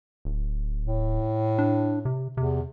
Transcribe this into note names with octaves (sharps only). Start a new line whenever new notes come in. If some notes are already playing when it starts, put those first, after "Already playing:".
D1
A2
D4
C3
E2 C3